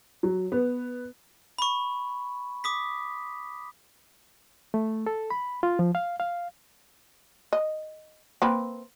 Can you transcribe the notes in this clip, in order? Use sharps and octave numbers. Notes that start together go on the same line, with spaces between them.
F#3
B3
B5 C#6
D6 D#6 B6
A3
A4
B5
F4
F3
F5
F5
D#5
A#3 C4 B4